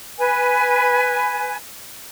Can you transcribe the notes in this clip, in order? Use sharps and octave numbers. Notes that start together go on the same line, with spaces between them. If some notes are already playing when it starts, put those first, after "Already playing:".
B4 G#5